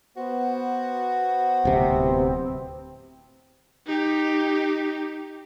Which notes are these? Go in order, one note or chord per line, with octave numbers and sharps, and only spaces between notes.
B3 F#4 C5
D1 C3 C4
D#4 G4